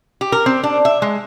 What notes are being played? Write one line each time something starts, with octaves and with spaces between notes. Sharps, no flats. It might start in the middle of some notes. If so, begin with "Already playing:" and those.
G4
A#4
C4
D4
E5
G#3